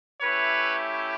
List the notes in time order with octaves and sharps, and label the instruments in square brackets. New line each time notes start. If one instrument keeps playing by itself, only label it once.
[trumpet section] A3 C#4 E4 G4 B4 C#5